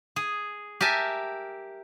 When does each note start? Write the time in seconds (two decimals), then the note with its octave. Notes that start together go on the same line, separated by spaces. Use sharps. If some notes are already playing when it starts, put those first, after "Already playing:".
0.16 G#4
0.81 G4 A#4 E5 G#5 A5